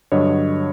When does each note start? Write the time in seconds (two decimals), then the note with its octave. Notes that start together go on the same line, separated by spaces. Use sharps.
0.12 G2 D3 F#3 C#5 D#5